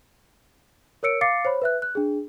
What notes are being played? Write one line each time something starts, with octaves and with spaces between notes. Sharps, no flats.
A#4 C#5 E6 C#7 D7
F5 D6 A6 C7 C#7
C5 C#5 B5
B4 E5 F#6
F#6
D4 G#4